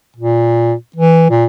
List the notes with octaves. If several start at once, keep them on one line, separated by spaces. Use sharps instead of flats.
A#2
E3
A#2